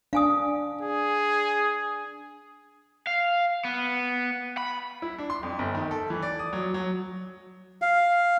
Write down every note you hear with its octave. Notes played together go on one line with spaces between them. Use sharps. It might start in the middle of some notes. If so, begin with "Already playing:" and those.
D4 F5 G#5 D#6
G#4
F5
B3
B5
E4
D4
C6
F2
G1
D#3
A4
E3
D5
D#6
F#3
F#3
F5